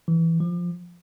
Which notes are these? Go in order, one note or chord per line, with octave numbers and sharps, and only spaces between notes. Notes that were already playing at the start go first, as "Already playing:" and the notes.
E3
F3